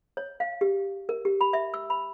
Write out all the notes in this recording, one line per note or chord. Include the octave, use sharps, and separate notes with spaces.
C#5
F5
G4
A#4
G4
B5
E5
E6
B5